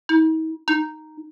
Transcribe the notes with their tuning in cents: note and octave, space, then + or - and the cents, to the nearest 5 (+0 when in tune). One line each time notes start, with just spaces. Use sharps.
D#4 +45
D#4 -5